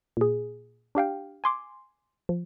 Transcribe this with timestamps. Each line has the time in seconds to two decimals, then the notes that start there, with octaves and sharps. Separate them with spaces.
0.17 A#2 G#4
0.95 D4 G4 F5 G5
1.44 G#5 C6 D6
2.29 F3